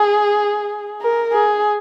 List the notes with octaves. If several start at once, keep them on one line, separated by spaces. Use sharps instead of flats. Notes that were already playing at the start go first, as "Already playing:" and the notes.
Already playing: G#4
A#4
G#4